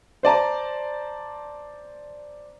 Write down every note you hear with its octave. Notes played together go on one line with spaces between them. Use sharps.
C5 D5 A5 A#5